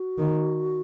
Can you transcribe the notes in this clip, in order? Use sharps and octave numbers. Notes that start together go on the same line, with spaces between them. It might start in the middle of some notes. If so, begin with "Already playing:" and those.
Already playing: F#4
D#3